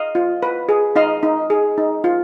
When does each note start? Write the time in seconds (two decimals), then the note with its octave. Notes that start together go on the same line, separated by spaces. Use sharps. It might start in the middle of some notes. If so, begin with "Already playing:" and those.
Already playing: D#5 F5
0.15 F4
0.43 B4
0.69 G#4
0.96 D#4 D#5 F5
1.23 D#4
1.50 G#4
1.78 D#4
2.04 F4